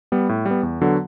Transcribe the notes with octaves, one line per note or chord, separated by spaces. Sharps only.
G3 B3
A2
G3 B3
E2
D3 F#3 B3 F#4